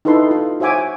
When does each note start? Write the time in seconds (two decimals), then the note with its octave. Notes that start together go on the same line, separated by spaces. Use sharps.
0.05 D#4 E4 A4 B4 C6
0.31 F4
0.60 F#4 C5 E5 G#5 D6